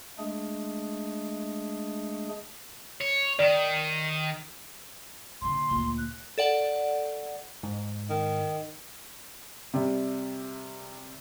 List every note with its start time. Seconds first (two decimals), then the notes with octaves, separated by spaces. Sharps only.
0.19 G#3 A3 D4 G#4
3.00 C#5
3.39 D#3 D5
5.41 A#2 D3 C6
5.71 D2 A#2
5.98 F#6
6.38 A4 D5 F#5
7.63 G#2
8.10 D#3
9.74 C3 G3